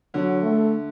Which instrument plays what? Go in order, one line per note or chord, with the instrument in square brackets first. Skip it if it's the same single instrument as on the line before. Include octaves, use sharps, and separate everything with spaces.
[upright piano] D3 [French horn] F#3
[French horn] A3